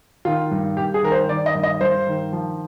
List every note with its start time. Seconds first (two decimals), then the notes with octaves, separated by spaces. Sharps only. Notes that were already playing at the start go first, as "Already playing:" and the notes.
0.25 D#3 F4
0.51 G2
0.77 G2 G4
0.94 G#4
1.03 D#3 A#4
1.12 C5
1.29 D#3 D5
1.46 D#5
1.55 G2
1.63 D#5
1.81 G2 C5
2.07 D#3
2.33 F3